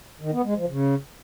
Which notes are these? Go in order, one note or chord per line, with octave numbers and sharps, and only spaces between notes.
D#3
B3
G#3
F3
C#3